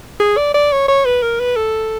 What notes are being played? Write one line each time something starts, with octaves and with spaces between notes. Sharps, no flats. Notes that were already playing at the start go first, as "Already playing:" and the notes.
G#4
D5
D5
C#5
C#5
B4
A#4
B4
A4